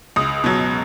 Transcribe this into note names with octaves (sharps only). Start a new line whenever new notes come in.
C#2 D#6
B2 F#3